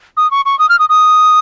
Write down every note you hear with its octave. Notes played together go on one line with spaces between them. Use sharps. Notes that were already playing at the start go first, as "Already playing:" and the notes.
D#6
C#6
C#6
D#6
F6
D#6
D#6